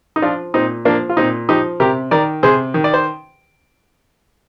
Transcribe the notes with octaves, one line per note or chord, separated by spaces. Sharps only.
D#4
F3 D4 F4
A#2 C4 D#4
F3 A#3 D4
F4
A#2 C4 D#4
F3 D#4 G4
C3 G4 A#4
D#3 A#4 D5
C3 G#4 C5
D#3
D5
C5